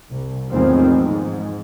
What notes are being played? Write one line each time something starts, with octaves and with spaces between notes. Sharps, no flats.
C2
E2 A2 D#3 F3 G#3 C4
G#2